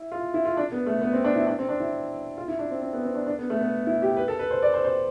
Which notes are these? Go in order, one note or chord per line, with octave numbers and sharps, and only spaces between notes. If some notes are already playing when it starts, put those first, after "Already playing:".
Already playing: E4
F4
E4
F4
D4
B3
A3
B3
C4
D4
E4
D4
C4
D4
E4
F4
E4
D4
C4
C4
B3
C4
D4
D4
B3
A3
B3
E4
G4
B4
A4
B4
C5
D5
C5
C5